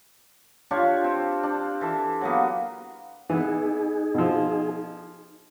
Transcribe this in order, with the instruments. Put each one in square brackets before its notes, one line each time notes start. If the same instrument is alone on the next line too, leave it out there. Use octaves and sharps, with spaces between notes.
[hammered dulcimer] D4 F4 G4 C#5
C4
D4
E3 A4
F#3 A#3 B3
[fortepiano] E3 B3 [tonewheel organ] D#4 G#4
[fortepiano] B2 F3